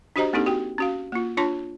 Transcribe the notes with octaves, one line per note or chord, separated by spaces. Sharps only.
D4 F#4 G4 C5 D#5 A#5
A#3 C4 D4 D#4 G4 A4
F#4 G4 G5
C#4 F#4 F5
A#3 F4
D4 F4 C#5 A5 C6